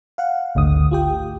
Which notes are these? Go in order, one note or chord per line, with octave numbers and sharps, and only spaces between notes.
F5 F#5
G#1 D2 D3 D#6
F4 G4 G5